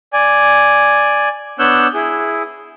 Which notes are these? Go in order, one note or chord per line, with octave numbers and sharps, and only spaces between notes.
D5 G#5
B3 D4 C#5 E6 F#6 G6
E4 G#4